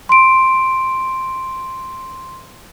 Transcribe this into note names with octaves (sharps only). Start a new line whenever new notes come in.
C6 D7